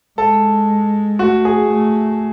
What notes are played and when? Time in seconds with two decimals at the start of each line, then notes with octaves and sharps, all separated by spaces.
0.18 G#3 A4
1.19 A3 F#4
1.45 G#4
1.69 A3